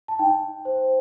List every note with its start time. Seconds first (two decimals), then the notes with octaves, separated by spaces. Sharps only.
0.08 A5
0.19 D#4 G5
0.65 C5